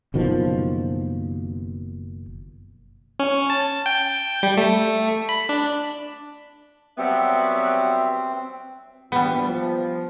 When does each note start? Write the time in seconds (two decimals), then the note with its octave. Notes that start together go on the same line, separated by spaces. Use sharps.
0.14 F#1 B2 D#3 F3
3.19 C#4
3.50 A5
3.86 G5
4.43 G3
4.57 A3
5.29 B5
5.49 D4
6.98 F#3 G3 B3 C4 E5
9.12 D2 A#2 E3 G3 B3
9.47 F3